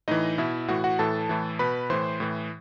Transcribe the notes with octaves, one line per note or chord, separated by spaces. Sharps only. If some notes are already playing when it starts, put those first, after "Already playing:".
A2 E3 D#4 D#5
B2 E4 E5
A2 E3 F#4 F#5
F#4 F#5
A2 E3 A4 A5
A2 E3
B2 B4 B5
A2 E3 C5 C6
A2 E3